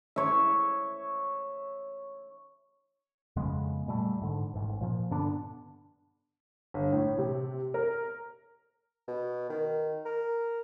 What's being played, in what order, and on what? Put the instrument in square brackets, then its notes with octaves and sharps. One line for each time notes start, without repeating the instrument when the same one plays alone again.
[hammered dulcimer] C#5 E5
[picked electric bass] F2 C#3 G#3 B3
A#2 G3 A3
G#2 D3
A1 G#2
A#2 F3
G2 D3 B3 D4
[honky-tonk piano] G1
A2
C3
A#4
[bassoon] B2
D#3
A#4